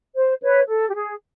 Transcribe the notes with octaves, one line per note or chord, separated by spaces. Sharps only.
C5
B4 C#5
A4
G4
G#4